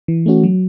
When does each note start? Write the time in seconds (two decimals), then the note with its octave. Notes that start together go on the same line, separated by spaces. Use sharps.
0.08 E3
0.26 A3 C#4 F#4
0.44 F#3